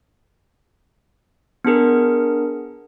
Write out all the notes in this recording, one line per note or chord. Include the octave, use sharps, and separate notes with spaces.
B3 D4 G#4 A#4